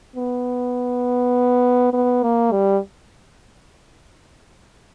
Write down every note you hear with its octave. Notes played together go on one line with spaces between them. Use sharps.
B3
B3
A#3
G3